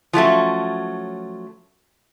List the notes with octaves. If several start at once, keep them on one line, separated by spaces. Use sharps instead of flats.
F3 F#3 A3 C#4